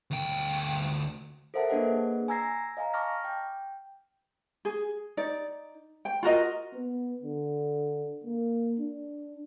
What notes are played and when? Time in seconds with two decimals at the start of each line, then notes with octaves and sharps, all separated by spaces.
0.11 D2 G5
1.54 A4 A#4 C5 E5 F#5 A5
1.69 A#3 D4 G#4 B4 D#5 F#5
2.28 G#5 A#5 E6 G#6 A#6 C7
2.77 D#5 F5 G#5 A#5
2.94 A5 C#6 D6 F6 A#6
3.24 G5
4.65 G#4
5.17 D#4 D5
6.05 G5
6.23 F4 F#4 A#4 D#5
6.74 B3
7.22 D3
8.24 A#3
8.79 D4